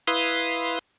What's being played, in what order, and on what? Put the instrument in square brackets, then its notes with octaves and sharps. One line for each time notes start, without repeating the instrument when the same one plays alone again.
[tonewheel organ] E4 B4 F5 C6 D#6